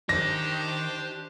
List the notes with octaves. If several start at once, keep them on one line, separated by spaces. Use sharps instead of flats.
D#3 D4 G4 C5 A#6